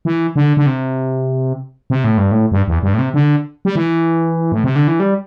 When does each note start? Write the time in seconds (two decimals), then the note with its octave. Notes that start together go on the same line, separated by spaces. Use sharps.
0.05 E3
0.36 D3
0.57 D3
0.66 C3
1.90 C3
2.04 A2
2.18 G2
2.31 A2
2.52 G2
2.68 E2
2.83 G2
2.94 A2
2.99 C3
3.14 D3
3.65 G3
3.76 E3
4.52 A2
4.64 C3
4.76 D3
4.88 E3
5.00 G3